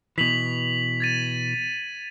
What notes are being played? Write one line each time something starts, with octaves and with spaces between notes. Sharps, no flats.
B2 E3 B6 F7 F#7
G#6 A6 D#7